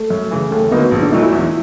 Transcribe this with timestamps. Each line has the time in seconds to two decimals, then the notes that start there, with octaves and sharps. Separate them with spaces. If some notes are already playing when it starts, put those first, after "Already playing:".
Already playing: A3
0.10 F#2
0.31 C#3 E3
0.51 D#2 A3
0.71 D3 F#3 A#3 B3 D#4
0.91 A#1
1.02 D4
1.11 A#2 F#3 A3 D#4
1.21 E4
1.32 E2